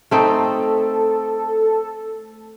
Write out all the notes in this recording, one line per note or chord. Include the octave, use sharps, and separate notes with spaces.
A3 C4 D#4 A4